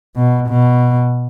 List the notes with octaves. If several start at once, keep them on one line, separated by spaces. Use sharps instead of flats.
B2
B2